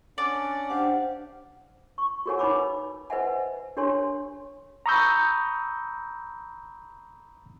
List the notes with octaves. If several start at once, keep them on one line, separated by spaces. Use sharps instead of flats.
C#4 D4 D5 F#5
D4 G4 C5 F5 F#5
C#6
F#4 G#4 A#4 C#5 F#5 G#5
D#4 B4 C#5 B5 D6 E6
B4 C5 D#5 E5 F#5 G#5
D4 G4 A#4 C#5 G#5 C6
A#5 B5 C#6 D#6 E6 G6